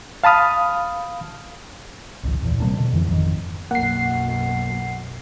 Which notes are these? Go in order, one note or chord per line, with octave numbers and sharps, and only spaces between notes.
F5 A5 B5 D#6 F6
G#1 C#2
D1 A#1 E2
C3 G3 A#3 D4
B2 D3
F1 F2 E3
G#1 F2 D3 D#3
B1 F#2 A#3 F#5 C7